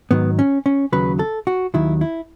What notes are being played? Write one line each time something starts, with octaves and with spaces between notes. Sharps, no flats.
G#2 D#3 F#3 B3
C#4
C#4
D#2 C#3 F#3 B4
A4
F#4
D#2 D#3 F#3 E4
E4